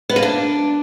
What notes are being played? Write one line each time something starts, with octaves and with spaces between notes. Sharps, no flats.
B3
A#3
D4